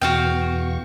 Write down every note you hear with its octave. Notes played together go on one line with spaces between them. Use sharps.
E2 B2 F#4 F5 G5 C#6